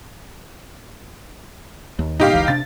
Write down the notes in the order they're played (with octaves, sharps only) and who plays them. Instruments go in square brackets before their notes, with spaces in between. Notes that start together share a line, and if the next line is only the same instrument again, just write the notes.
[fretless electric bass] D#2
[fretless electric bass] G#2 B2 [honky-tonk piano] D#4 G4 F5
[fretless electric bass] F#1 C#2 E3
[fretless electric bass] C3 D4 [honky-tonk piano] A6